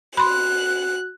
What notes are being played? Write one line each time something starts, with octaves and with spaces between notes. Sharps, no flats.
F#4 B5 C6 F#6